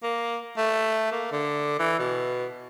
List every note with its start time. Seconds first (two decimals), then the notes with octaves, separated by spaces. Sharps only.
0.03 A#3
0.57 A3
1.11 A#3
1.32 D3
1.79 E3
1.99 B2